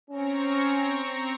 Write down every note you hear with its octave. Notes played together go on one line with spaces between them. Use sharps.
C4 C#4 A#5 C#6